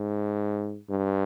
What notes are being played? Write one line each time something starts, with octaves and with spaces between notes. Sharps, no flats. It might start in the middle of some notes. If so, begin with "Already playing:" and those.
Already playing: G#2
G2